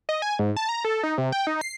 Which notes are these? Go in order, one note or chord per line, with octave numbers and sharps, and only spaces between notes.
D#5
G#5
G#2
A5
A#5
A4
D#4
C3
G5
D#4
C7